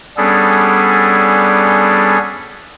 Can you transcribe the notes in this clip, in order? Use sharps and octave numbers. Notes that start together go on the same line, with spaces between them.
G3 B3 C#4 D4 G#4 A4